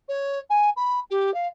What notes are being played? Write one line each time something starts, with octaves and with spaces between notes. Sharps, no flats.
C#5
G#5
B5
G4
F5